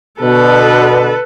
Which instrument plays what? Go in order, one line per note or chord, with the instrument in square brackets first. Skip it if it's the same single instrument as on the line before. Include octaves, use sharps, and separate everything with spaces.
[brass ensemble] B2 D3 [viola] A4 B4